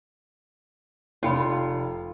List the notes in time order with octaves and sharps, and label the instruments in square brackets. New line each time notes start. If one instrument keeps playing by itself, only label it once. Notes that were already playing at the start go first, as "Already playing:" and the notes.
[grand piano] F1 [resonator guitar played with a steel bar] F4 [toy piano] C#5 G5 B5